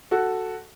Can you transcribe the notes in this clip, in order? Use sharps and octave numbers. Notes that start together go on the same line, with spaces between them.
F#4 A4